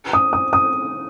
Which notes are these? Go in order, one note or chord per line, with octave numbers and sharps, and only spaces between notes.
D#6
D#6
D#6